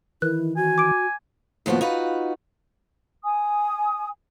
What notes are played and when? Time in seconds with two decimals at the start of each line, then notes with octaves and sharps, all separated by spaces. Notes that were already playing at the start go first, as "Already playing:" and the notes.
0.22 D#3 E3 E4 F#6
0.56 F#4 G#5
0.78 D6 D7
1.66 D#2 A2 F3 B3 F#4
1.81 D#4 F4 F#4 B4
3.23 G#5 D#6